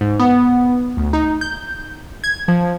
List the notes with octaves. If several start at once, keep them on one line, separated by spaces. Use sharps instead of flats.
G#2
B3
D2
D#4
G6
G#6
F3